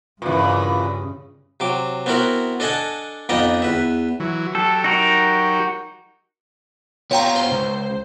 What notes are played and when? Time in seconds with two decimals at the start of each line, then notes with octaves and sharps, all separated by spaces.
0.22 G2 A#2 C#3 E3
1.60 C3 F#3 D6
2.06 B3 C4 E4 F#4 A#4 F#5
2.60 D4 A4 D#5 F#5 G#5 A5
3.29 F2 B3 D#4 D5 D#5 D#6
3.62 E2 B4 E5
4.20 E3 F#3
4.55 F#3 G4 A4
4.84 D#4 F#4 A#4
7.11 B3 F4 C#5 G5 A#5
7.36 C5
7.52 C#2